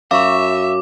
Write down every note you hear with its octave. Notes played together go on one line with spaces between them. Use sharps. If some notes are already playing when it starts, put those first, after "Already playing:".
F#2 E5 F5 C#6 D6